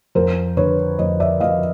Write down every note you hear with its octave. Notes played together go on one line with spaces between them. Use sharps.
F2 A#4 C5
D3 B4 C#5
F2 C#5 D#5
D5 E5
F2 D#5 F5